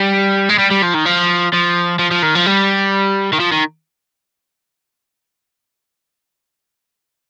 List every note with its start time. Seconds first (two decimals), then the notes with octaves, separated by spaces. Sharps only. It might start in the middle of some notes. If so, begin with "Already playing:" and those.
Already playing: G3
0.49 G#3
0.59 G3
0.71 G3
0.83 F3
0.95 D#3
1.06 F3
1.53 F3
1.99 F3
2.11 F3
2.23 D#3
2.35 F3
2.46 G3
3.33 D#3
3.40 F3
3.52 D#3